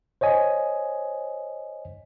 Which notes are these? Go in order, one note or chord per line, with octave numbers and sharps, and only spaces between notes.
C5 C#5 D#5 G#5